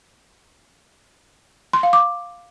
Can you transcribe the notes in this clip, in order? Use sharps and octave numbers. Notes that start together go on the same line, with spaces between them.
C6
F5
D6